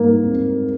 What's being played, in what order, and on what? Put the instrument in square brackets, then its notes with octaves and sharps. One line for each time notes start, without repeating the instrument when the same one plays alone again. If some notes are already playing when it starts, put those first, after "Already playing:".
Already playing: [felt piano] G#2 G3 D#4 [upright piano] A#3
[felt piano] C4